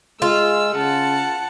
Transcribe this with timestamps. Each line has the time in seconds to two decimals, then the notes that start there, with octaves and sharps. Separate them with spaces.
0.22 G#3 F4 E6
0.75 C#3 F#5 A5